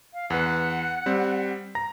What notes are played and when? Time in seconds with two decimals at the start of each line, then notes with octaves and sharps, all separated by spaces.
0.14 F5
0.30 E2 B4 F#5
1.06 G3 C4
1.75 A#5 A#6